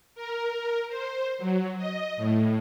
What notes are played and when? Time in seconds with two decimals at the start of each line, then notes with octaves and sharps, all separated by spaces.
0.15 A#4
0.89 C5
1.39 F#3
1.77 D#5
2.17 A2